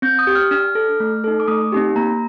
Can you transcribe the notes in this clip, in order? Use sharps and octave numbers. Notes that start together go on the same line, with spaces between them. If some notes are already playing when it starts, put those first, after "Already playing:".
C4 G6
D#6
G4
F6
D4 F6
A4
A3
D#4 A4
D6
A3 D#6
C4 D#4 G4
A#3 A#5